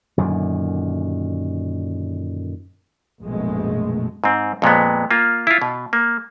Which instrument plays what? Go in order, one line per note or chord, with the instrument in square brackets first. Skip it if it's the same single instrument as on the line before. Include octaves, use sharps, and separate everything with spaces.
[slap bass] F#2 A#2 D3 D#3
[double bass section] A#1 F#2 B2 G#3 A3
[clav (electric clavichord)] G#2 C4
F2 A#2 G#3 B3
A#3 F4
E4 F4
B2
A#3